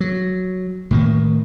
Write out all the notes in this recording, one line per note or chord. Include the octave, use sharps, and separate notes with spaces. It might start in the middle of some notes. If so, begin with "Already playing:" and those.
F#3
A2 D#3 A#3